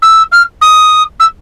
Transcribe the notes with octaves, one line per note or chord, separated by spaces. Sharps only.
E6
F6
D#6
E6